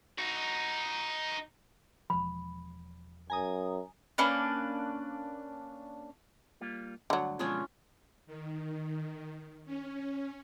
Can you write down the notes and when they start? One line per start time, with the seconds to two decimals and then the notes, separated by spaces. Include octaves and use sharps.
0.18 D#4 F#4
2.10 E1 F3 B5
3.30 F#2 G#5 A#5 D#6
4.18 A#3 C#4 D4 B4
6.61 G3 A#3 F4
7.10 D2 G2 D3 F#3 F#5
7.39 F2 B2 G#3 C#4 D4 F4
8.26 D#3
9.65 C#4